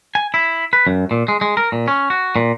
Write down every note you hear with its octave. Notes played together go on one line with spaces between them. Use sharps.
G#5
E4
B4
F#2
A#2
G#3
G#3
A#4
A#2
C#4
F#4
A#2